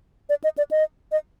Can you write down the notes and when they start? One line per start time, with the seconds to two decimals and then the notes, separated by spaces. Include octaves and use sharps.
0.29 D5
0.44 D#5
0.58 D5
0.71 D#5
1.12 D#5